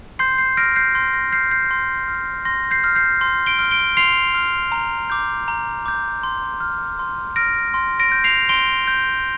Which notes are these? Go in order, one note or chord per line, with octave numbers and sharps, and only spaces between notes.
C6 G6 C7
G6 C7
F6 A#6 D7
G6 C7
C6 G6
A#6
F6 G6 C7
G6 C7
C6
F6
C6 A#6
G6 C7
F6
G6 C7
C6
D7 G7
F6
D7 G7
C6 C7 F7
F6
A#5
D6 G6
A#5
D6 G6
C6
F6
C6
F6 A#6 D7
C6
A#6 D7
G6
C7 F7
C6 D7 G7
G6